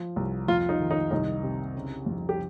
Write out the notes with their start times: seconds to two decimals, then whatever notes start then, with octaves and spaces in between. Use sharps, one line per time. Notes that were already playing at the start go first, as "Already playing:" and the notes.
Already playing: F3
0.16 C2
0.48 F2 F4
0.69 D#4
0.80 D#3
0.91 D#4
1.11 C2 D#4
1.43 C3
1.75 C#3
2.06 F2
2.29 G4